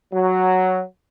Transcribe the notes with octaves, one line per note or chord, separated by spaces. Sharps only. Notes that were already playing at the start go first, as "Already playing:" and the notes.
F#3